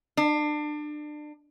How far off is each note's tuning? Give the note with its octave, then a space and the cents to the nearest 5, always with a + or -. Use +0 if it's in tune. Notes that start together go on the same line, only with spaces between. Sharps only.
D4 +30